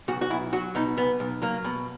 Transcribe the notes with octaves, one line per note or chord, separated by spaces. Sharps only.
B1 F#4
F#4
B1 E4
F#3 F#4
B2 D#4
B1 B3
B1
F#3 A#3
B2